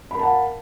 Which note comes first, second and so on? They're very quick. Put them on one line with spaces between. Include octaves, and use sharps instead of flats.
B5 A#4 A5 F#5 F5